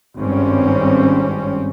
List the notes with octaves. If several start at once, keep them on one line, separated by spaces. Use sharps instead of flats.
G#1 G2 C4 C#4